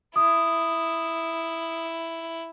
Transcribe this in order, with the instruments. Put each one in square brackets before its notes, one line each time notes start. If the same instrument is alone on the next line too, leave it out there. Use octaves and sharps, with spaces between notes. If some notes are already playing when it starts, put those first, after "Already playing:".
[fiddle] E4 [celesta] D#6